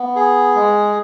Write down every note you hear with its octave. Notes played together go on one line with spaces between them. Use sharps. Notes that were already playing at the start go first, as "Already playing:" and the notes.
Already playing: B3
G#4
G#3